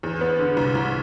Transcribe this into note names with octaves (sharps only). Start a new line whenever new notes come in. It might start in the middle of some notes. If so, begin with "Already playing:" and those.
E2
B3
D3
C2
C2